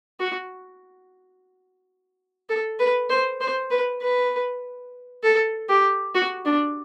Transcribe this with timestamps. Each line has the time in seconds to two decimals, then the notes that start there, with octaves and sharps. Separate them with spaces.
0.20 F#4
2.49 A4
2.79 B4
3.09 C5
3.41 C5
3.71 B4
4.02 B4
5.23 A4
5.69 G4
6.15 F#4
6.45 D4